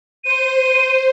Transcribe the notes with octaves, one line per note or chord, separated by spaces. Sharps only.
C5 D#7